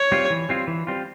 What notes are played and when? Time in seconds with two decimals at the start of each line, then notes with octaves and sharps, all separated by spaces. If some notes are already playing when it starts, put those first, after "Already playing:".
Already playing: C#5
0.12 G3 C4 F4
0.30 E3
0.49 G3 C4 F4
0.67 E3
0.87 G3 C4 F4